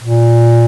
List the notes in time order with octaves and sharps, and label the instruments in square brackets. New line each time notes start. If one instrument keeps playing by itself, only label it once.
[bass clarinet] A#2